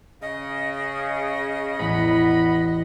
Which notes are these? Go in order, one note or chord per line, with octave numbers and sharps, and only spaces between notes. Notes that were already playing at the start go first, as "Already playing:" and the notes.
C#3 D#5
E1 A1 E2 B3 B5